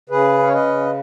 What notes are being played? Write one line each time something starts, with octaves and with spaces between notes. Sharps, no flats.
C#3 G#4 B4
C#4
C#5
B4 D#5
C#3